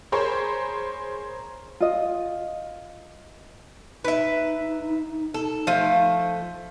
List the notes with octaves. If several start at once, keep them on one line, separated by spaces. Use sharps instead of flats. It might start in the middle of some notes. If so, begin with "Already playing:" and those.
G#4 A#4 C5 C#5 B5 C#6
F4 D#5
D#4 B4 E5
A4
F3 A3